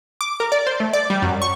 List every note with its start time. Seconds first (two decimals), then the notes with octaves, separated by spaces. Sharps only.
0.21 D6
0.40 A#4
0.52 D5
0.67 C5
0.80 A3
0.93 D5
1.10 G3
1.22 F#2
1.42 C#6